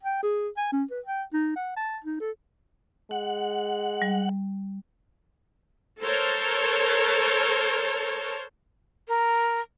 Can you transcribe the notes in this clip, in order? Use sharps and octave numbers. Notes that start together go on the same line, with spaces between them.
G5
G#4
G#5
C#4
B4
G5
D#4
F#5
A5
D#4
A4
G#3 F#5
G3
A4 A#4 C5 C#5 A5
A#4